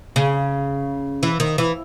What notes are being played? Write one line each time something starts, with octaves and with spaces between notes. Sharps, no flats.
C#3
E3
D#3
E3